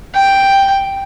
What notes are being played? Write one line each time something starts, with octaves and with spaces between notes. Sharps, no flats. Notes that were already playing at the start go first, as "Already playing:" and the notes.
G5